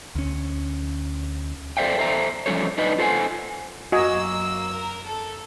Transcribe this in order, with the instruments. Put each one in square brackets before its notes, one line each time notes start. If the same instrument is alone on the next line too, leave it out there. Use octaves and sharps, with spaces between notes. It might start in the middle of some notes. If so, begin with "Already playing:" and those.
[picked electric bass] D2 C#4
[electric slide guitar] A4 C5 D5 E5 F5 G5
A4 C5 E5 A#5
F3 G3 C#4 A4 C#5
D4 D#4 B4 D#5
F4 A4 C5 E5 F#5 G#5
[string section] F#2 A#3 E6 [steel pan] F#4 D#5 G#5
[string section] A#4
A4